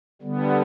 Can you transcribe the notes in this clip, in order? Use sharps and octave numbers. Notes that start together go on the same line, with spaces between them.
D3 G3 B3